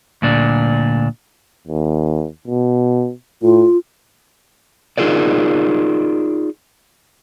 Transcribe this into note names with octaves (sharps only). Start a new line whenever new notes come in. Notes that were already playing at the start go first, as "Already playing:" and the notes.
D2 A#2 D4
D#2
B2
A2 F4
D#4 F4 G#4 A#4 D5